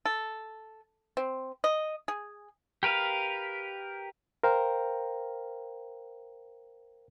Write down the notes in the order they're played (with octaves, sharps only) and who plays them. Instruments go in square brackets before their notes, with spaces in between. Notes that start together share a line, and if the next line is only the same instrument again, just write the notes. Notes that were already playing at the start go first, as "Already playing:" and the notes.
[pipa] A4
C4
D#5
G#4
[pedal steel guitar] G4 A#4 B4 F5
[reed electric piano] A#4 C5 F5 G5 A#5